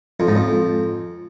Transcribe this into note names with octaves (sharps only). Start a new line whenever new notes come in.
F2
G#2
F2